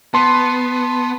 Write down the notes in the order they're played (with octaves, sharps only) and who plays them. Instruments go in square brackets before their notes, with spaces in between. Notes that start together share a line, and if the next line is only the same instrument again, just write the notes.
[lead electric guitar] B3 [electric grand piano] A5 C6